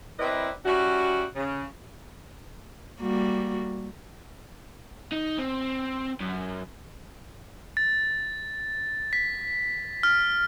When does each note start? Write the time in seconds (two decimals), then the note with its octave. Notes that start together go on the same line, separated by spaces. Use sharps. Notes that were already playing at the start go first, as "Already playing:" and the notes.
0.19 C4 E4 A#4 B4 D5 D#5
0.66 G3 C#4 E4 F#4
1.36 C#3
3.01 G3 A#3 F#4
5.12 D#4
5.38 C4
6.21 F#2
7.77 A6
9.13 B6
10.03 F6